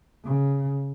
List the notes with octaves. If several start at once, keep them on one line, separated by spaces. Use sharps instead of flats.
C#3